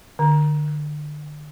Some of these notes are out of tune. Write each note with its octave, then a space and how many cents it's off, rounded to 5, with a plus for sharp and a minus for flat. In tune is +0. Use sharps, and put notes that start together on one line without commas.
D3 +30